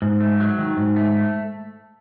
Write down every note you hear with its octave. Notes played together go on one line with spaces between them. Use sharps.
G#2
A3
F#3
D#3
G#2
A3